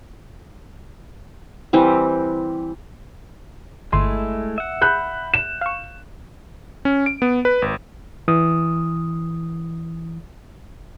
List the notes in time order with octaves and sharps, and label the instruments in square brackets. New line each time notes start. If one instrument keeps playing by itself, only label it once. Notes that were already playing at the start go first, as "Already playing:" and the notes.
[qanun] E3 G3 C4
[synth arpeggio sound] G1 C6 D#7 [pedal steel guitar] G#3 A3 E4
[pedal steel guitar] E5 F#5
[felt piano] B5 F#6 G6
E7
[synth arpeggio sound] F5 C#6
[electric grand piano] C#4
D7
B3
B4
G#1
[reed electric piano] E3 D#6